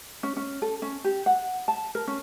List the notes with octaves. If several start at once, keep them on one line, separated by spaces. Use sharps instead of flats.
C#4
C#4
A4
C#4
G4
F#5
A5
A#4
C#4